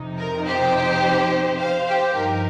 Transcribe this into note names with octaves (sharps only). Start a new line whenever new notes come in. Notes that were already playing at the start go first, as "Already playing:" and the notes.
Already playing: F2 C3 F3 D#4
A#4
G4 C5
C5 F5
G4 C5
G2 F3 D#4 A#4